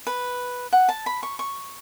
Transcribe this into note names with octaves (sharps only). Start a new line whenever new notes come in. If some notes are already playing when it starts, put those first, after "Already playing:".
B4
F#5
A5
B5
C#6
C#6